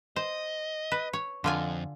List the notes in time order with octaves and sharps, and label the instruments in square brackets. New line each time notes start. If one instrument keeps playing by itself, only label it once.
[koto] C5 [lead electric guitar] D#5
[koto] B4
C#5
[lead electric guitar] F2 [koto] D3 F4 G#5